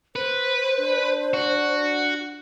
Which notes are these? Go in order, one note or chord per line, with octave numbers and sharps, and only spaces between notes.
B4 C5
D4
F#4